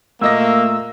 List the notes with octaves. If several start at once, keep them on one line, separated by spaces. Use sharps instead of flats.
A#2 A3 A#3 D#5 E6 A#6